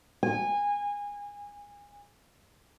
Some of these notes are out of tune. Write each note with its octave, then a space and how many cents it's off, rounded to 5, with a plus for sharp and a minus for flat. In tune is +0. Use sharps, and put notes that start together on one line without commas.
G#5 -25